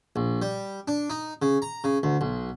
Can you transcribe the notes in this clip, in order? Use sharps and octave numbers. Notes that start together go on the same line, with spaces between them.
A#1
G3
D4
D#4
C#3
A#5
C#3
D2
B1